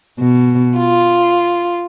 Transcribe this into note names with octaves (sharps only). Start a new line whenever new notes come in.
B2
F4